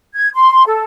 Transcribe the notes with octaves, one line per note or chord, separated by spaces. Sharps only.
G#6
C6
A4